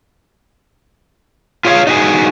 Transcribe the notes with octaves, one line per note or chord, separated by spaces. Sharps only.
F4 G#4 C#5 D#5 F5
D#4 F#4 G#4